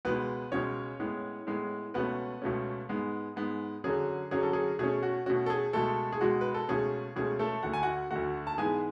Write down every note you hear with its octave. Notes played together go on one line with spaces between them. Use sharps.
C#2 B2 G#3 B3 B4
C#2 B2 G#3 C#4 C#5
A2 G#3 B3
A2 G#3 B3
C#2 B2 A3 B3 C#4 B4
C#2 B2 A3 C#4
G#2 G#3 B3
G#2 G#3 B3
F#2 D3 F#3 C#4 G#4
F#2 D3 F#3 C#4 G#4
A4
G#4
B2 A3 C#4 G#4
F#4
B2 A3 C#4 F#4
A4
G#4
C#2 B2 G#3 A3 A4
G#4
C#2 B2 G#3 F#4
B4
A4
C#2 B2 A3 C#4 G#4
C#2 B2 A3 C#4 G#4
A3 A4
D2 D3 A3 F#5
G#5
F#4 F#5
D2 D3 A3 F#4 F#5
A5
G#2 E3 G#3 B3 G#4 G#5